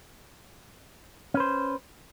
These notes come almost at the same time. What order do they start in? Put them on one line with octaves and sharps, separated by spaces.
C#4 B4 C5